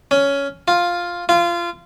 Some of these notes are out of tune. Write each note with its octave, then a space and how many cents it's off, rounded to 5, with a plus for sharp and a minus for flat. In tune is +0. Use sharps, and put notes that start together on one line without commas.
C#4 +10
F4 +5
F4 -20